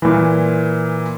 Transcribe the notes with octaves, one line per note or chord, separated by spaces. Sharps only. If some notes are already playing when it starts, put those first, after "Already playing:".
A#2 E3